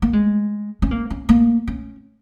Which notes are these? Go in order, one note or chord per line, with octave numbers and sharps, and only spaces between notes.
A#3
G#3
C#4
A#3
C#4
A#3
C#4